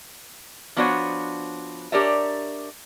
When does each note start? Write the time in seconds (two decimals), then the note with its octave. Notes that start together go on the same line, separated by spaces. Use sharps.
0.76 F3 B3 D4 F#4 C5 C#5
1.92 D4 G4 A#4 C#5 D5 E5